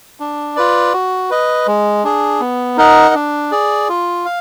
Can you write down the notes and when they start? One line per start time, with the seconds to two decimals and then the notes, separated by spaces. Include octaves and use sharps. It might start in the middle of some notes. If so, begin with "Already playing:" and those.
0.20 D4
0.56 F4 B4 D5
0.93 F#4
1.30 B4 D#5
1.67 G#3
2.04 D4 G#4
2.40 B3
2.77 D#4 A#4 D#5 F#5
3.15 D4
3.51 G#4 D5
3.89 F4
4.25 F5